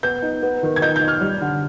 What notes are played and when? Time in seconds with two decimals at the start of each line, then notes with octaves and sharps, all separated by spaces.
0.03 B3 G6
0.22 D#4
0.43 B3
0.63 D#3
0.76 G#6
0.82 D#4 G6
0.96 G6
1.02 D#4
1.08 F6
1.21 G3
1.41 D3